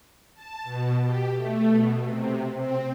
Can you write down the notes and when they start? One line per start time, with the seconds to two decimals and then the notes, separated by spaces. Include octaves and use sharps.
0.34 A5
0.63 B2
1.04 G4
1.35 A3
1.70 B2
2.02 C3
2.53 C4